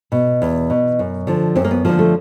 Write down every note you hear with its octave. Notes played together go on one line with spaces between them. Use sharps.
B2
E2
B2
F#2
D3 F3
F#2 C4
A#3
B3
D3 F3 A#3
A3